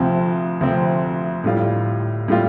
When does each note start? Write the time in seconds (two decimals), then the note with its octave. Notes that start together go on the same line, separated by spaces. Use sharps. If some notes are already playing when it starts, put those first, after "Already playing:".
Already playing: D2 C3 F3 C4
0.61 D2 C3 F3 C4
1.44 A2 G3 F4
2.28 A2 G3 F4